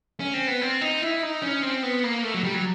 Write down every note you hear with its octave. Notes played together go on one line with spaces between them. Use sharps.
C#4
C4
B3
C4
D#4
E4
D#4
C#4
C4
B3
A#3
A3
F#3
G3
F#3